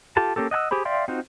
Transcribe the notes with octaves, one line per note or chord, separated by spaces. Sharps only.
F4 G4 A4 A5
A#3 C#4 G4 A4
D#5 F#5 G#5 E6
G4 G#4 C5 B5
D5 E5 F5 G5 C6
C4 D#4 F4 F#4 C5